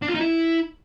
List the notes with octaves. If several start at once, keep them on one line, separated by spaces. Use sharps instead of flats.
D4
F4
D#4
E4